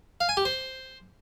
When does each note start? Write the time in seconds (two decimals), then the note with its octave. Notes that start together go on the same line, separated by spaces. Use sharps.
0.21 F5
0.29 G#5
0.37 G4
0.45 C5